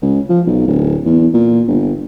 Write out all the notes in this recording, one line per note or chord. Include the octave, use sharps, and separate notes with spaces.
C#2
F3
B1
D1
E2
A#2
G1